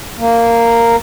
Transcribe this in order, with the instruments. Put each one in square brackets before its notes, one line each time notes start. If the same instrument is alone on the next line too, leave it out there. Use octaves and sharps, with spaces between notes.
[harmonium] A#3